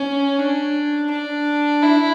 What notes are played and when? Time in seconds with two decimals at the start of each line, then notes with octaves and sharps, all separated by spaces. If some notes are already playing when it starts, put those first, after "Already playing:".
Already playing: C#4
0.39 D4
1.10 D4
1.82 E4